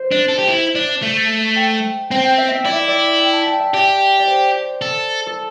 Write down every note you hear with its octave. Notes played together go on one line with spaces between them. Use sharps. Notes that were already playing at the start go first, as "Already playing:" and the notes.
Already playing: C5
D4
A4
G4
E4
D4
A3
G5
C4 G5
G5
E5
E5
E4 D5
E5
D5
G5
A5
G5
E5
G4 D5
D5
C5
A4
A4